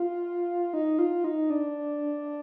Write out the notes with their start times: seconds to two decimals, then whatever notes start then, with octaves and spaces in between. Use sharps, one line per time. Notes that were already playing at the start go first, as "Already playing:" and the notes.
Already playing: F4
0.73 D#4
0.99 F4
1.24 D#4
1.50 D4